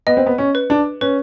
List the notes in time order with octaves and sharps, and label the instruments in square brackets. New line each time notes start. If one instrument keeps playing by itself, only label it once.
[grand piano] B3 [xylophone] D#5
[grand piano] C4
B3
C#4
[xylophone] B4
[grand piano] D4
[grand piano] C#4 [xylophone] B4